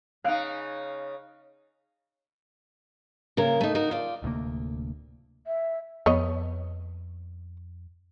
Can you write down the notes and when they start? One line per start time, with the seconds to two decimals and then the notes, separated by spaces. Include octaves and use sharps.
0.24 C#3 D#4 F5 F#6 D7
3.37 C#3 A#3 A#4
3.61 A3 D#4
3.75 D#4 F#4 A#4
3.91 F4 D5
4.22 D1 D2 C3 A#3
5.47 E5
6.06 F2 B3 C#5 D#5